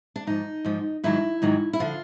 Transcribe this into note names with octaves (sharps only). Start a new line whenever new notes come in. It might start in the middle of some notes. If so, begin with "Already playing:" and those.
D4
G#2 F3 D#4
G#2 F3
G#2 D#3 F#3 E4
G#2 D#3 F#3
E4
D3 F3 F4